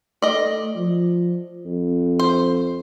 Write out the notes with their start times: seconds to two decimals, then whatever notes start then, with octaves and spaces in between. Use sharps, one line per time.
0.22 A3 D5 D#5
0.76 F3
1.66 F2
2.19 C5